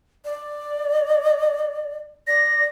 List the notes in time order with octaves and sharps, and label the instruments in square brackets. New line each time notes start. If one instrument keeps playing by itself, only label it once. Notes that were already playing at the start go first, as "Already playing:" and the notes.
[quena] D5
[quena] D5 [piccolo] A#6